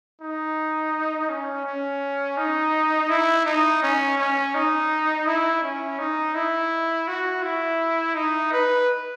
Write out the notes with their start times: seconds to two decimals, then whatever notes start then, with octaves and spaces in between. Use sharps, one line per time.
0.22 D#4
1.30 C#4
1.65 C#4
2.37 D#4
3.10 E4
3.46 D#4
3.83 C#4
4.18 C#4
4.55 D#4
5.26 E4
5.63 C#4
5.99 D#4
6.35 E4
7.08 F#4
7.43 E4
8.15 D#4
8.52 B4